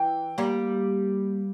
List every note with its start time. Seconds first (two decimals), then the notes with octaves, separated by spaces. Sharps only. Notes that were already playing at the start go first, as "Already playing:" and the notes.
Already playing: E3 G5
0.38 G3 A#3